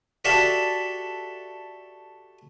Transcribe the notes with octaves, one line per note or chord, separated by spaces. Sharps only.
F#4 G4 A4 D5 E5 F5